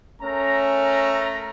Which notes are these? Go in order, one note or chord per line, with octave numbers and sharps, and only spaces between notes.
A3 C#4 A#4 A#5